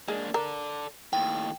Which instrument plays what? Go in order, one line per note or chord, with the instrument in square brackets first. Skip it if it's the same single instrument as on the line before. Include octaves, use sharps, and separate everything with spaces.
[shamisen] G#3 [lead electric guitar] A#3 D4
[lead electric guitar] A4 D5 [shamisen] A#4
[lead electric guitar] D#2 A2 [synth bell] G5